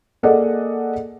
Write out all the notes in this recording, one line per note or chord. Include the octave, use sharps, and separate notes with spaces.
A#3 G#4 A4 D5 D#5 F#5